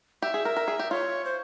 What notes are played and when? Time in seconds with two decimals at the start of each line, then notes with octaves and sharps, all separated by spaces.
0.22 G4 E5
0.34 G#4
0.45 A#4
0.56 A#4
0.68 G#4
0.79 G4
0.91 F4 C#5
1.25 C5